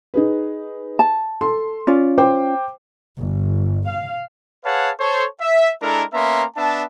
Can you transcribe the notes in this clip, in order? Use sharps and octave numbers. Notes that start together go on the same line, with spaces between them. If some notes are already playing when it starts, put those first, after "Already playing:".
D#4 G#4 B4
A5
A4 C6
C#4 F4 D5
C5 G5 D6
G1
F5
G#4 B4 C#5 F5 F#5 A5
A4 C5 C#5
E5
G#3 D4 E4 A4 A#4
A#3 B3 C#4 E5 A#5 C6
B3 D4 E5 A5